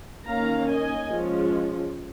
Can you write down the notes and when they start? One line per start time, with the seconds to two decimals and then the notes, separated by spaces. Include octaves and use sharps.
0.26 D#3 A#3 C#4 F5 A#5
0.69 D#5 G#5
1.10 F3 G#3 C#4